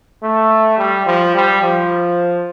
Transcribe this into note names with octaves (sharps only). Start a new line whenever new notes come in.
A3
G3
F3
G3
F3